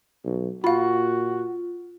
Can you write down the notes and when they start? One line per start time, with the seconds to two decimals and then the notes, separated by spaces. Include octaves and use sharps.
0.25 B1
0.64 A#2 F4 F#4 F5 B5